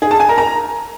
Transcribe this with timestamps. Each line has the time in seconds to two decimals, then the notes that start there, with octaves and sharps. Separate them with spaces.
0.02 G#4
0.11 A5
0.20 G#5
0.29 A#4
0.38 A#5